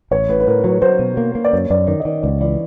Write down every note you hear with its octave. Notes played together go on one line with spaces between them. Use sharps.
A1 C#5
A2 B4
B4
A2 A#4
F#3 B4
F#3 C5
B2
A#3
A#3
D5
F#2 C#5
F#2 D5
D#3 D5
D#5
D#3 D5
C#2 D5
E3 D5